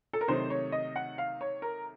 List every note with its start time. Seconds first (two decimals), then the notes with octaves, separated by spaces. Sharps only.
0.13 A4
0.21 A#4
0.28 C3 D#3 F#3 A3 D#4 C5
0.50 C#5
0.72 D#5
0.96 F#5
1.18 F5
1.41 C#5
1.62 A#4